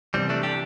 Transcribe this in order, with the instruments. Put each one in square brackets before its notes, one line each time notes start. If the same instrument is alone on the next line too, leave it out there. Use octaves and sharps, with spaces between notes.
[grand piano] C2 C3 E3 [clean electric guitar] G3 C4
[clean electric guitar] A3 D4
D4 G4